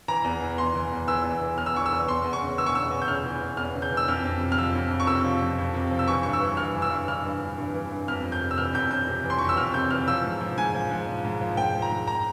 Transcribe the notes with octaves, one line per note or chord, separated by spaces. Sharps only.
E3 A#5
E2
E3
E2 C6
E3
E2
E3 E6
E2
E3
E2 F6
E6
E3 C#6
E6
E2
E2 C6
E2
C#6
C#3
E3 E6
C#6
E2 E6
E2
G6
C#3 F6
E3
E2
E2 F6
C#3
G6
E3
E6
F2 F6
F2
C3
F6
F3 E6
F2
F2
C#6
C3 E6
F3
F2
F2
C3
F3
E6
E3 C#6
G2 C#6
E6
E3
G2 F6
E3
E6
G2
E3 F6
G2
E3
G2
E3
G2
F2 F6
F2
G6
C3
E6
E3 F6
F2 G6
F2 G6
C3
E3
C6
F2 C#6
E6
F2 F6
C3 G6
E3 F6
F3 E6
G#2
F3
G#2 G#5
F3
G#2
F3
G#2
F3
G#2 G5
F3
A#5
G#2
A#5